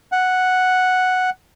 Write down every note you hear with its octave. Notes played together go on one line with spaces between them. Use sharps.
F#5